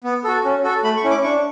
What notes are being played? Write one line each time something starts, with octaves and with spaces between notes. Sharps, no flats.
B3
F#4 A4
C#4
F#4 A4
A3 B5
C#6
C#4 E4
D6
D4 C#6